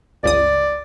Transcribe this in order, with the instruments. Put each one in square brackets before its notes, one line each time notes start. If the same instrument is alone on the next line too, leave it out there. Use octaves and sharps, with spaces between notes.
[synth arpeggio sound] G1 C#2 D#6 [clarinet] D5